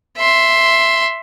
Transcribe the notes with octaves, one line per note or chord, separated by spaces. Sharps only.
E5 C6